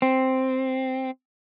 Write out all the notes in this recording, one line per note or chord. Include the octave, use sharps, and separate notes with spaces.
C4